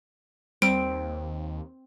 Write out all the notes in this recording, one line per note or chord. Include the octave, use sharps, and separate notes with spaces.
D#2 G3 C4 D7